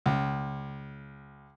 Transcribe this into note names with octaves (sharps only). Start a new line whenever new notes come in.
C#2